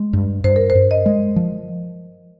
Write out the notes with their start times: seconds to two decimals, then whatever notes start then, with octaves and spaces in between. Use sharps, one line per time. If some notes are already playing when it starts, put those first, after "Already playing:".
Already playing: G#3
0.13 G2
0.44 G2 C5
0.56 A#4
0.70 C5
0.75 G2
0.91 D#5
1.06 G#3
1.36 F3